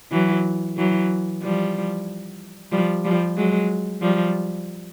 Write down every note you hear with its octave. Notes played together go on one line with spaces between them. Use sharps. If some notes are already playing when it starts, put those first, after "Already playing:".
E3 F#3
E3 F#3
F3 G3
F3 G3
F3 G3
F#3 G#3
F3 G3